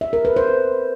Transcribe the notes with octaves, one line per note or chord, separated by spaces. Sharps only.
E5
A#4
B4
C5